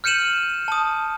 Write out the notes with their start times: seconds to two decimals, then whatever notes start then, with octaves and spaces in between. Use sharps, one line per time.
0.04 F6 G6 C#7 D#7 E7 F#7
0.68 A5 D#6